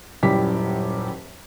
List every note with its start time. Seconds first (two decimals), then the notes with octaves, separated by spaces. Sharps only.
0.23 D#1 F#2 G3 E4 G4 B6